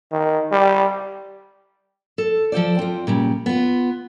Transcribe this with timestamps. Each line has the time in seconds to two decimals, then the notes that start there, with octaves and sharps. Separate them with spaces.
0.12 D#3
0.52 G3
2.18 A4
2.52 F3 A4 C5 D5
2.79 C4 F4
3.07 A#2 C#3 G3
3.46 B3 F4